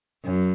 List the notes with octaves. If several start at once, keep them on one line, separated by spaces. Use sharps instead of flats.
F#2